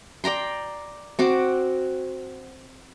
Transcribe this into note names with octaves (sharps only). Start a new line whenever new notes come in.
D5 G5 A#5 C6
C4 F#4 D6